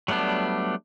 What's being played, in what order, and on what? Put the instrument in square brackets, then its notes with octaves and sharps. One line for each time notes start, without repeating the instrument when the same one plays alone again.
[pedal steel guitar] F#3 G3 A3 B3 D4